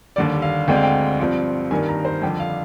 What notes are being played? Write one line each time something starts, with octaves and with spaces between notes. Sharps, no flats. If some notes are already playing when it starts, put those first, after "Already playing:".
D#2 D3 G3 D5
F5
D2 D3 G#3 C4 G5
F5
G5
G2 F3 C4
G2 D#3 A#3 G#5
A#5
C5
F2 D3 G3 D4 G5
F5